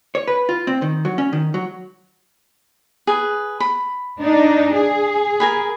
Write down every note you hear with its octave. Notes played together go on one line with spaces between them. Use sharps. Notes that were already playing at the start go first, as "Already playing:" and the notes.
C#5
B4
F4
C4
D#3
F#3
C#4
D#3
F#3
G#4 B4
B5
D4 D#4
G#4
A#4 G#5 B5